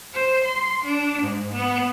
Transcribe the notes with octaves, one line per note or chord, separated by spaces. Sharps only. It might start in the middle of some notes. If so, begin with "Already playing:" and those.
C5
C6
D4
G#2
B3